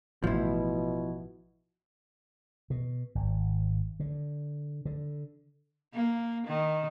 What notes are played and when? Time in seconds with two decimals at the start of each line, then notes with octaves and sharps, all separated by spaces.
0.24 A1 B2 F3 E4
2.70 B2
3.15 G#1
4.00 D3
4.85 D3
5.94 A#3
6.47 D#3